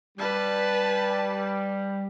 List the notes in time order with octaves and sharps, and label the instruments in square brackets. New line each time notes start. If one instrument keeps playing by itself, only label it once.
[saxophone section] G3 [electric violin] B4 A5